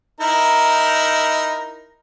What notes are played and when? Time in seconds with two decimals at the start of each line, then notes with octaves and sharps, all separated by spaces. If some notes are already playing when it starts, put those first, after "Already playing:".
0.21 D#4 E4 A#4